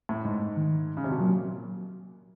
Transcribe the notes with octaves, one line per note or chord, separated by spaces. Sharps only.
A2
G#2
D#3
C#3
C3
B2
A#2 F#3